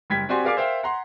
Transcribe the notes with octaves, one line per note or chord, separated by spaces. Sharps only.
F#1 G3 G5 G#6 B6
C4 F#4 G4 D5 G#5 C6
G#4 A#4 D5 F5 G#5 D6
A#4 C5 E5 F5 G5
F#5 A#5 C6